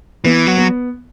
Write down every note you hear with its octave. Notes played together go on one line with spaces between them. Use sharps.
E3 B3
F#3
B3